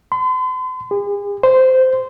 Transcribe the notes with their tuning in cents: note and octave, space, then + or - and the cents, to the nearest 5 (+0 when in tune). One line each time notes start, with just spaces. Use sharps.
C6 -45
G#4 -40
C5 -15